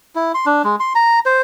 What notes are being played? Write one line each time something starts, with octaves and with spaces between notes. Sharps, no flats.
E4
C6
D4
G#3
C6
A#5
C5